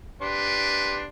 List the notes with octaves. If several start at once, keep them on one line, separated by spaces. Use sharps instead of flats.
D4 G4 B4 C6